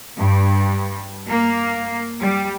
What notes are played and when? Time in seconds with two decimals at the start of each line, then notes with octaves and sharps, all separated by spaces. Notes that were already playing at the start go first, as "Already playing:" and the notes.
0.16 G2
1.27 A#3
2.20 G3